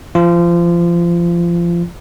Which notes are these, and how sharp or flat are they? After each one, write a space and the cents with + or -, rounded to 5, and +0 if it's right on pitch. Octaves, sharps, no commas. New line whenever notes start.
F3 -25 F4 -25